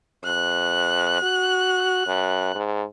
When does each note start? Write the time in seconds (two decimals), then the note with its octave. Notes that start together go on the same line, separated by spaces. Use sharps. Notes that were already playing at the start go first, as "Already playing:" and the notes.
0.24 F2 F#6
1.22 F#4
2.07 F#2
2.55 G#2